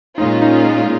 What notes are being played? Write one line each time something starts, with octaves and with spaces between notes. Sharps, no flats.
A#2 G#3 C#4 D#4 F4
D#4